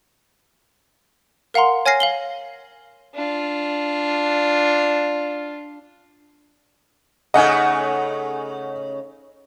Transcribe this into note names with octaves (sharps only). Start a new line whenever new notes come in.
A#4 F5 F#5 A#5 C6
C#5 G#5 F6 A#6 C7
F5 F#7 G7
D4 F4
C#3 A3 D#4 D#5 F#5 G#5